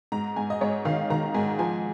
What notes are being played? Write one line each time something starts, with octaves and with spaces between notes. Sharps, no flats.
G#2 A#5
G#2 G#5
D#5
G#2 C#5
D#3 F5
D#3 A#5
G#2 G#5
F3 G#5